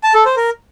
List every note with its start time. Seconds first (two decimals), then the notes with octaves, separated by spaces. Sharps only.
0.04 A5
0.15 A4
0.26 C5
0.37 A#4